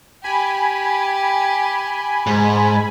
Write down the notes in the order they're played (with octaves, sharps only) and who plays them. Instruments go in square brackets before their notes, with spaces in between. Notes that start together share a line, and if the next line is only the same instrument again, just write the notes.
[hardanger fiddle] G4 [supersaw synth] G#5 B5
[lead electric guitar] G#2